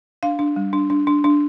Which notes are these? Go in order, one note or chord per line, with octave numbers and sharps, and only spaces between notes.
D4 F5
D4
G3
D4
D4
D4
D4